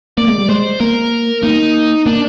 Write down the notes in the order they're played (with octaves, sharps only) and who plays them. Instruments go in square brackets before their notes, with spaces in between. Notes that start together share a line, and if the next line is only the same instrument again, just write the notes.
[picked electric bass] A#3 [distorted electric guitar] D5
[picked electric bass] G#3
G3
[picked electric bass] G#3 [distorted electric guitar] C5
[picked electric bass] A#3 [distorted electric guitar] A#4
[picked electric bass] A#3 [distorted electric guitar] D#4
[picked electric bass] A#3 [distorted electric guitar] D4